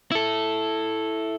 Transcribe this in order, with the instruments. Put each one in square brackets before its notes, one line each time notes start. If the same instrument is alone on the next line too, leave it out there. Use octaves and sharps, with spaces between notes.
[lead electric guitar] E4 A4